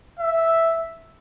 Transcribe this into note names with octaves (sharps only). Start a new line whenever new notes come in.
E5